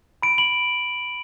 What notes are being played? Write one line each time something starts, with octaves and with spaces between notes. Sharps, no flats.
B5 D7
B5 F#7